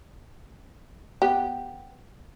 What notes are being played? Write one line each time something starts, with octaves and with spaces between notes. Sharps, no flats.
B3 G4